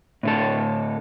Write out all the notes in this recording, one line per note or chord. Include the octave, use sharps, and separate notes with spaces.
A2 D3 A4